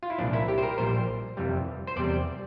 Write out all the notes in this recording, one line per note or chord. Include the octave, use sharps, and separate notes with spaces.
F4
E4
C2 A#2 F3 D4
E4
G4
C5
A#4
A#1 A#2 G3 C5
F2 C3 E3 G3
C5
E2 C3 G3 D5